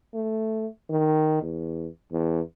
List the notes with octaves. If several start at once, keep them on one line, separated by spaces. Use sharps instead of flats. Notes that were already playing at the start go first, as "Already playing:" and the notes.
A3
D#3
E2
E2